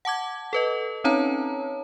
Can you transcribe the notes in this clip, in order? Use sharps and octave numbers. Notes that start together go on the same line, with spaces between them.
F#5 A5 D6 G#6
A4 B4 D#5
C4 C#4 D#4 C#5 A5 A#5